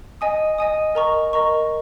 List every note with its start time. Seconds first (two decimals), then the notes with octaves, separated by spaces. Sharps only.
0.21 D#5 G#5 D#6
0.58 D#5 G#5 D#6
0.95 A#4 D#5 A#5 C#6
1.33 A#4 D#5 A#5 C#6